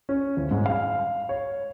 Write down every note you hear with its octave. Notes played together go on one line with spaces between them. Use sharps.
C#4
D1
G#2
F5
C#5